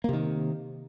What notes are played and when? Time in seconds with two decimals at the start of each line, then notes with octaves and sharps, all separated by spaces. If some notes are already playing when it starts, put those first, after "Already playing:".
0.04 A#3
0.09 C3
0.13 D#3